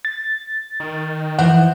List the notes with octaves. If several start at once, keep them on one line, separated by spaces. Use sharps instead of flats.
A6
D#3
E3 F3 C5 F#5